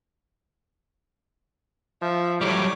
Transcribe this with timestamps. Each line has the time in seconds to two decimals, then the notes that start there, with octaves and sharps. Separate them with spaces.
2.02 F3 E5
2.41 A2 F#3 G3 C#5 D6